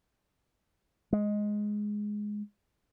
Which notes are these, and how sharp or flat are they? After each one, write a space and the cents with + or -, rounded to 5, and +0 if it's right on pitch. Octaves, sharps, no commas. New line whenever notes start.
G#3 +5